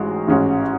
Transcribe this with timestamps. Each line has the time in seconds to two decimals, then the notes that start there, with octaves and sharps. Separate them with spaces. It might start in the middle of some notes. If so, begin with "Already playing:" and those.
Already playing: A1 G#2 G#3 F#4
0.28 A1 G#2 G#3 C#4 F#4